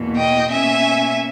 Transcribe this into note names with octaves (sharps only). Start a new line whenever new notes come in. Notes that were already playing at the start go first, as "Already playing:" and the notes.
Already playing: E2 B2 A#3
D#5 G5
B2 A#3 C#4 E5 G#5